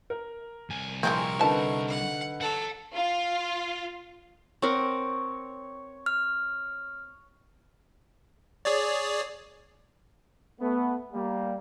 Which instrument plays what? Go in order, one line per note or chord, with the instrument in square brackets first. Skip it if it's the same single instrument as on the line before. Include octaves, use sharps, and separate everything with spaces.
[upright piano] A#4
[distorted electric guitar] C2 G#5
[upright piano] A#1 [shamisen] E3 G#3 C4 [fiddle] A#4 C#6
[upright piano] D3 D#4 B4 [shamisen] E5 A5
[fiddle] F#5
[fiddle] A4 [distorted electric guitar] F#5 A#5
[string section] F4
[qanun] C4 A#4 F#5 [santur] C#5
[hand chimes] F6
[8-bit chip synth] G#4 C#5 D5
[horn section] A3 B3
G3 A#3